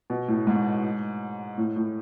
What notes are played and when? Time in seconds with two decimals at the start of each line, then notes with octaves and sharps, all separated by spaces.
0.10 B2
0.28 A2
0.47 G#2
1.58 A2
1.76 A2